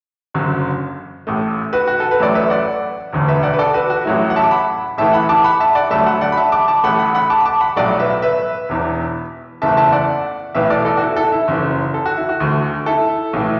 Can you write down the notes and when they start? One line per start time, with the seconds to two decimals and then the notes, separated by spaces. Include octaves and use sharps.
0.34 F#1 F#2 D3 F#3
1.27 A1 A2 A3
1.73 F#4 B4
1.87 F#4
2.00 A4
2.11 B4
2.20 A1 A2 F#3 A3 D5
2.35 B4 E5
2.50 D5 F#5
3.13 E1 D2 D3
3.28 B4 E5
3.43 D5 F#5
3.54 B4
3.59 A4 D5
3.74 F#4 B4
3.90 F#4
4.05 A1 A2 F#3 A3 E4
4.30 F#5
4.36 E5 A5
4.44 D6
4.51 F#5 B5
4.98 A1 A2 E3 A3 E5 A5
5.13 F#5 B5
5.29 A5 D6
5.44 F#5 B5
5.60 E5 A5
5.75 D5 F#5
5.90 D2 D3 F#3 A3 E5 A5
6.06 F#5 B5
6.21 D5 F#5
6.32 B5
6.37 E5 A5
6.52 A5 D6
6.68 A5 D6
6.84 A1 A2 A3 F#5 B5
6.99 F#5 B5
7.15 F#5 B5
7.30 A5 D6
7.40 B5
7.46 A5 D6
7.61 F#5 B5
7.76 B1 A2 F#3 A3 D5 F#5
7.99 B4 E5
8.22 B4 E5
8.69 E1 E2 E3
9.62 F#1 E2 E3 A3 E5 A5
9.77 E5 A5
9.92 D5 F#5
10.55 B1 A2 E3 B4 E5
10.70 A4 D5
10.85 A4 D5
10.97 F#4
11.01 E4 A4
11.16 E4 A4
11.32 E4
11.48 F#1 F#2 E3
11.94 A4
12.06 F#4
12.17 E4
12.29 F#4
12.40 D2 D3 A3
12.86 E4 A4
13.33 B1 A2 E3 A3